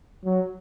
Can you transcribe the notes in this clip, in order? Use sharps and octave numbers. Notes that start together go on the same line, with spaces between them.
F#3